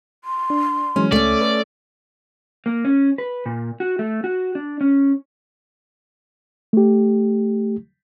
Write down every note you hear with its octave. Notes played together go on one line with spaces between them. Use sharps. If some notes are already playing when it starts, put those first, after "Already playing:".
C6
D4
E3 F#3 G#3 C#4
C#2 A3 C#4 D5
A4 B4
A#3
C#4
B4
A#2
F#4
A3
F#4
D4
C#4
A3 G4